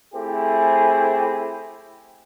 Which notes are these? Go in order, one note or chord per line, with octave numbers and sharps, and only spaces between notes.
A3 C4 E4 G4 G#4